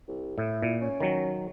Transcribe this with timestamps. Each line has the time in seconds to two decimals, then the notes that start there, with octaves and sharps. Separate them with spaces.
0.08 C2
0.38 A2 E4
0.62 A#2
0.81 C#4
1.00 D#3 F#3